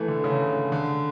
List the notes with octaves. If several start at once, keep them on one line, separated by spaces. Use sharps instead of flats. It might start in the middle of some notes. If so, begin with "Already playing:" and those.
Already playing: E3 A3
D3
C#3
D3